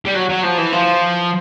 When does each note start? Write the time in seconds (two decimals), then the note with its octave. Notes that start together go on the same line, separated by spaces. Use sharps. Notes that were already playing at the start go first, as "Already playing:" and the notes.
0.05 G3
0.14 F#3
0.29 F#3
0.43 F3
0.58 E3
0.72 F3